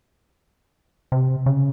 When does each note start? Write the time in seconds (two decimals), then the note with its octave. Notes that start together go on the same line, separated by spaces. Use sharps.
1.12 C3
1.46 C#3